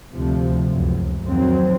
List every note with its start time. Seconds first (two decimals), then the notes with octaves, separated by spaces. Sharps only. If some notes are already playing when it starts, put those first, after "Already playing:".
0.11 D2 C3 F3
0.72 C#2 F#2
1.23 F2 A2 D#3 F#3 C4